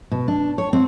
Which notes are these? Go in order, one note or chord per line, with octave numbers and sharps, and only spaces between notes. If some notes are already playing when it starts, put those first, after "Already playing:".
B2
D4
C#5
C4